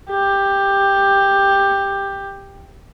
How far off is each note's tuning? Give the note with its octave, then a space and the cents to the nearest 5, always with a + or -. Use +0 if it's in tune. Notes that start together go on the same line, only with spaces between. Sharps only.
G4 +10